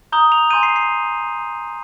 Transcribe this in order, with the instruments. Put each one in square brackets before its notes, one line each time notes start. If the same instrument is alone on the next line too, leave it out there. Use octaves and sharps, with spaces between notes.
[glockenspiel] A#5 D#6 G6 G7
F7
G#5 C6 G6 D#7
C7
C7